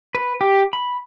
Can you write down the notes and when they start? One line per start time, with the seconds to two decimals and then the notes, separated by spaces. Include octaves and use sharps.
0.15 B4
0.41 G4
0.73 B5